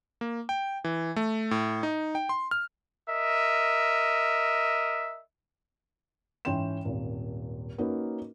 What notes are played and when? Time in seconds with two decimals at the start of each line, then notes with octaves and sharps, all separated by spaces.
0.21 A#3
0.49 G5
0.84 E3
1.16 A3
1.51 A2
1.83 D#4
2.15 G5
2.29 C6
2.51 F6
3.08 A#4 D#5 E5
6.45 G#2 E3 C#4 G5 C6 E7
6.85 D#1 G#1
7.78 A#3 C#4 D#4 F#4 A#4 B4